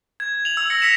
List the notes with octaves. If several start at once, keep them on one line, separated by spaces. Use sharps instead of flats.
G#6
F7 F#7
E6
A#6 C#7
E6 A#6 B6 C#7 E7